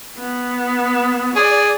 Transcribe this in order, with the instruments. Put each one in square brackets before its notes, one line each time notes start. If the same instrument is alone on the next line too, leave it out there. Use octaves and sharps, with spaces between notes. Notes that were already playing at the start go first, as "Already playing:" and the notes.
[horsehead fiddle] B3
[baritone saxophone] G#4 [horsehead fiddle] D5